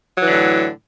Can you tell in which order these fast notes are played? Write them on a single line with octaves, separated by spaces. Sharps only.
F#3 E3 D3 A2